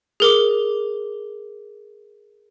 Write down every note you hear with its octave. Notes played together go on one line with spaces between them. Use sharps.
G#4 A#4 D6